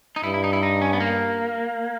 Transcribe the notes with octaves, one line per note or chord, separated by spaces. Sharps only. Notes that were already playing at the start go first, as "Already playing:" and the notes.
D#4
G2 E4
E4
D#4
E4
D#4
C#4
B3
A#3